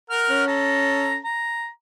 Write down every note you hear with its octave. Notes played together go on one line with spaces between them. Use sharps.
A#4 F#5 F6
C#4
A4 A#5
A#5